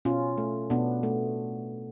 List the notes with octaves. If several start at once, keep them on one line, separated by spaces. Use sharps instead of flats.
B2 C#4 F4
A3
B2 B3 D4
A3